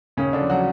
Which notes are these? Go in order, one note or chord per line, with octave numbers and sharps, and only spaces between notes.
D#2 C#3 C#4
D3 D4
F3
F#3 F#4